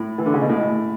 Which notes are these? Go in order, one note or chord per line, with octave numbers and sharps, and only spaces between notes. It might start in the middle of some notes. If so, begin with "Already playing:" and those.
Already playing: A2
E3
D3
C#3
B2
A2